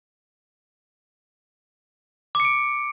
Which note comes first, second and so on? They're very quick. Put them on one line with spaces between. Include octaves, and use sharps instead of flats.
D6 C#7 D7